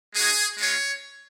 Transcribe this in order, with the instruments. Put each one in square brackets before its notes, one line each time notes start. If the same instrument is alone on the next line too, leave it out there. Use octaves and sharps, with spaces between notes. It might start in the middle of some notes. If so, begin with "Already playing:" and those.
[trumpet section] G#3 D#4 F#4 G#4
G#3 C#4 F4 C#5